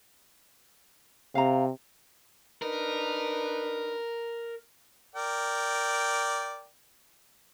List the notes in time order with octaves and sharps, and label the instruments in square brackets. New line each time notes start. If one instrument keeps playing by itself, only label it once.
[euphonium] C3 [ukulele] F5 A#5
[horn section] D4 D#4 B4 [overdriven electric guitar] A#4
[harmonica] A#4 D5 G5